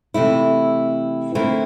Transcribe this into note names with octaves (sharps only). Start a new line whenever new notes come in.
C3 E3 A3 E4
D3 A3 C4 E4 A#4